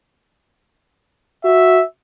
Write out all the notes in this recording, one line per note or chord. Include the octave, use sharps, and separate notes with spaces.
F#4 E5